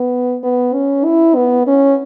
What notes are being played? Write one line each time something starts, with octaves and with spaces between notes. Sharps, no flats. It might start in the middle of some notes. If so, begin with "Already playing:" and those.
Already playing: B3
B3
C#4
E4
B3
C#4